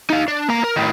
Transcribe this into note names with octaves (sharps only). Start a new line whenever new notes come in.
D#4 F5
D4
A#3 A#5
A#4
A2 D#3